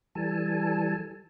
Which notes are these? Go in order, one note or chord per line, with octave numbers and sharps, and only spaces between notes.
E3 G3 A4 G#5 A5